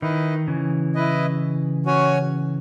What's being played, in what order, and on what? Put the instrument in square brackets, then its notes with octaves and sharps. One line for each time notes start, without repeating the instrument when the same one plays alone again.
[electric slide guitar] D#3 [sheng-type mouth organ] E4 B4 D#5
[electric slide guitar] C#3 E3
[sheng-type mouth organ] E4 B4 D#5
C#4 F#4 C#5 G#5